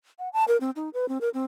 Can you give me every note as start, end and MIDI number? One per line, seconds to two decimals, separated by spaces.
0.19 0.29 78
0.33 0.44 81
0.48 0.57 70
0.60 0.70 60
0.76 0.89 63
0.94 1.08 71
1.08 1.18 60
1.21 1.29 70
1.34 1.45 60